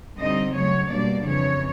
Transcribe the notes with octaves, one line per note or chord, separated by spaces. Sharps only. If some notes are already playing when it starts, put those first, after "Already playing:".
D3 G3 C4 D#4 D#5
F#2 C#3 F#3 A3 C#5
B2 G3 A#3 D4 D5
F2 C#3 E3 C#5